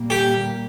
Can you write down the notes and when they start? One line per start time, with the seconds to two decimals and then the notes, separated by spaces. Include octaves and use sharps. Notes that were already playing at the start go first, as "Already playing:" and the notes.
Already playing: A#2 G3 A#3
0.10 G4